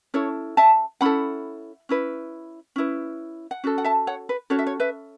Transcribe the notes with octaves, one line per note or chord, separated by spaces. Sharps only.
C#4 E4 A4 C#5
E5 A5
C#4 E4 A4 F#5 B5
C#4 E4 B4
C#4 E4 B4
F#5
C#4 F#4 A4
F#5
E5 A5
C#5 F#5
B4
C#4 F#4 A4 C#5
E5
C#5
B4 E5